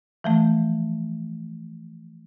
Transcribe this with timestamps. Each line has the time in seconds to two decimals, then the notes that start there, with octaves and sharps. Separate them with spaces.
0.24 E3 F3 A3